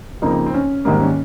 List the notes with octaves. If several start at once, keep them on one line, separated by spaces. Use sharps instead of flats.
F2 C#3 F3 A#3 C4 D#4
C4
C#4
G#2 D#3 G3 A#3 C4
C#4